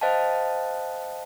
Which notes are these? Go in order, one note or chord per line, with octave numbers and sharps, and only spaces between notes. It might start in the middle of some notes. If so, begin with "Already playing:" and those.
C5 D#5 F5 G5 A5